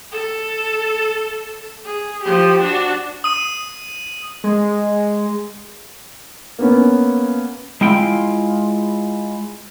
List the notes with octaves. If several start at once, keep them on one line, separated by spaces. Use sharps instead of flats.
A4
G#4
F3 G4
D4 F#4
D#6 D#7
G#3
A#3 B3 C#4
G#3 E4 F4 G5